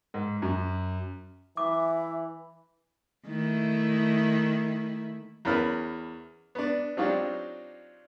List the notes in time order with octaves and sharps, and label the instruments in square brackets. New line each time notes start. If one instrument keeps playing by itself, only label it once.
[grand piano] G#2
F#2
[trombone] E3 [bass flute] E5 [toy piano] D6
[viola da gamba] D#3 A3 E4
[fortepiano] E2 C#4 A#4 B5 F6
B3 D4
F#3 C4 D4 D#4 F4 G4